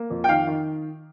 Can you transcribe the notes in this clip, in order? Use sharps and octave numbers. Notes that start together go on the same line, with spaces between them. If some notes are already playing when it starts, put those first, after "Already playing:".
Already playing: A#3
F2
G5
D#3 F5
D#3